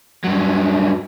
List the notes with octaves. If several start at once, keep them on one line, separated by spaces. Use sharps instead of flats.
G2 F#3